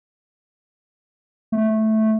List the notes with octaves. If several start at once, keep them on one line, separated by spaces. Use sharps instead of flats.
A3